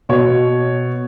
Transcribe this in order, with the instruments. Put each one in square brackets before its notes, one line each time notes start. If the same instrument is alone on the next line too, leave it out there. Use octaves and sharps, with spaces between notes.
[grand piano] B2 C#5